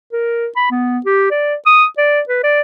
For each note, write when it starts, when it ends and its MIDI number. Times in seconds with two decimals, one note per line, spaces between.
0.12 0.48 70
0.56 0.67 83
0.71 0.99 59
1.05 1.26 67
1.31 1.55 74
1.66 1.85 87
1.98 2.21 74
2.28 2.43 71
2.43 2.61 74